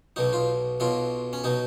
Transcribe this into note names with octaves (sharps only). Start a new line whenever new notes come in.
B1 B2 F#3 D#4
F4
B1 B2 F#3 F4
C#4
B2 F#3 D#4